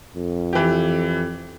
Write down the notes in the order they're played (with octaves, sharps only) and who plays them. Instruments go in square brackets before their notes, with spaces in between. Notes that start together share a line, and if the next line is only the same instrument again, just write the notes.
[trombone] F2
[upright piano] E3 G4